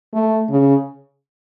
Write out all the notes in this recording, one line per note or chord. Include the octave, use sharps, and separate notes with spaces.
A3
C#3